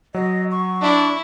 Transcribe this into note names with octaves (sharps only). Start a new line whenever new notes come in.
F#3 D#5
C#6
D4 E4